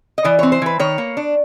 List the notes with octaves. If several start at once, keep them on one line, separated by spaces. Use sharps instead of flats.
D#5
E3 D5
C4 C#5
C5
E3 B4
D#3 C#5
A#3
D4